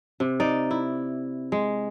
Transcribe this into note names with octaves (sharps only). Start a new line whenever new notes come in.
C3
D#4 D5
E4
G#3